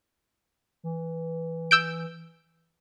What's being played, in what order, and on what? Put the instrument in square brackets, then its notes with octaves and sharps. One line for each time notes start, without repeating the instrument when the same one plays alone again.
[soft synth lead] E3
[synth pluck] E6 G6 D7